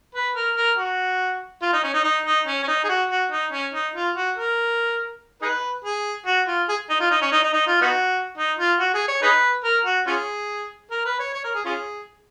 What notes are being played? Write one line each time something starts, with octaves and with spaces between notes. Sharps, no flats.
B4
A#4
A#4
F#4
F4
D#4
C#4
D#4
D#4
D#4
C#4
C#4
D#4
G#4
F#4
F#4
D#4
C#4
D#4
F4
F#4
A#4
D#4 G#4 B4
G#4
F#4
F4
G#4
D#4
F4
D#4
C#4
D#4
D#4
D#4
F4
B3 D#4 F#4
D#4
F4
F#4
G#4
C#5
D#4 G#4 B4
A#4
F#4
C#4 F4 G#4
A#4
B4
C#5
C#5
A#4
G#4
C#4 F4 G#4